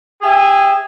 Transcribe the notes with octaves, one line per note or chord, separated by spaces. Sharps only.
G4 G#4 E5 G#5